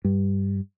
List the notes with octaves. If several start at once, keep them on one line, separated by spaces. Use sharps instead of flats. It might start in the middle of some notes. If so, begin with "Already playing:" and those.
G2